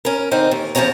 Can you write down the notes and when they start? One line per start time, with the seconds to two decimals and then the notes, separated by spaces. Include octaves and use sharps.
0.05 C#4 A#4
0.31 D3 C4 D#4 C5 F5
0.51 D#2 E3
0.75 E2 F3 F#3 C#4 C#5 A#5